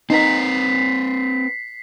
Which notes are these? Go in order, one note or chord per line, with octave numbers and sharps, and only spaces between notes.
C4 D#4 B4 A#5 B6 C7